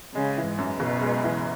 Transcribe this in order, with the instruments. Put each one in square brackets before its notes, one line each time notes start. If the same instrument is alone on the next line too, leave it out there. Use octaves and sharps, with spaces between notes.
[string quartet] C#3 [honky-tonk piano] G#3
[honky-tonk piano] E3
[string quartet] G#2
[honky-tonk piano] F#2
[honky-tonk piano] F#1 [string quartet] B2
[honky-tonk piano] G#3
E3